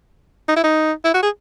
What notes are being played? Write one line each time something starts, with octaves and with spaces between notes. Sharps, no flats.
D#4
E4
D#4
E4
F#4
G#4